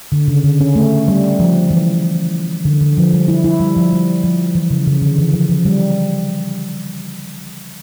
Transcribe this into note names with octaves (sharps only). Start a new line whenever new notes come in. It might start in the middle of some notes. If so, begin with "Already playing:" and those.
D3
C#3
D3
C#4
A3
G3
F3
E3
D3
D3
F3
G3
E4
E4
G3
F3
G3
F3
E3
C#3
C#3
D3
E3
F3
F3
G3